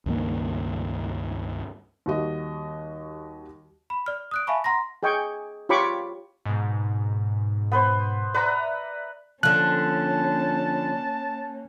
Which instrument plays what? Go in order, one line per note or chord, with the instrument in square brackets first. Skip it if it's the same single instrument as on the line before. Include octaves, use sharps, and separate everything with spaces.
[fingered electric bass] C#2 G2 D#3 A#3
[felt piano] D#2 G3 F#4 D#5
[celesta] B5
D5 F6
D#6 F#6 D7
E5 F5 G#5 A5 B5 C#6
F#5 A#5 C6 A#6
[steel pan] G#4 D#5 G5 G#5 C#6
F4 G4 C#5 B5 C#6 D6
[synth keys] G#2 B2
[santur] B3 B4 C5
[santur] B4 F#5 A#5 [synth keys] D5 E5
[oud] D3 F3 [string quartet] A#3 C#4 [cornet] A5 [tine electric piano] F#6